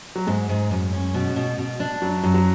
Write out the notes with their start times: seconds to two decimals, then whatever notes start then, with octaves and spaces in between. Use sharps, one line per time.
0.16 F#3
0.27 G#2 G#3
0.49 G#2
0.71 F#2
0.92 C#4
1.14 B2
1.36 B2
1.58 B2
1.80 D4
2.02 F#2 F#3
2.23 F#2 F#3
2.34 F#3